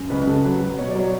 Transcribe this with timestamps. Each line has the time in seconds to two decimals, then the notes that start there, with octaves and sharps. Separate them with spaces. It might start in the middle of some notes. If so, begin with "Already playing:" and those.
Already playing: F#2
0.10 C#2 B4
0.27 C#3 A4
0.44 F#3 B4
0.61 F#3
0.78 B2 C#5
0.89 D5
0.95 F#3 C#5